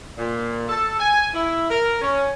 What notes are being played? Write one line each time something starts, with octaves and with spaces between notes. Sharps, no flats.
A#2
A4
G#5
E4
A#4
C#4